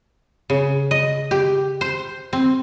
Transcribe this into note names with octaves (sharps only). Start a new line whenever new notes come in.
C#3
D#5
G4
C5
C4